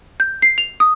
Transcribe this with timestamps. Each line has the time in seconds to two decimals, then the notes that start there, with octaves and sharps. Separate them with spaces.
0.20 G6
0.42 C7
0.58 F7
0.80 D#6